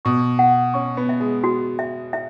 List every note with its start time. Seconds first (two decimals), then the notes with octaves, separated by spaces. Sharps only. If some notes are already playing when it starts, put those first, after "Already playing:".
0.05 B2 C#6
0.39 F#5
0.74 C#4 C#6
0.97 B3
1.09 E5
1.20 G#3
1.44 F#4
1.79 E5
2.13 E5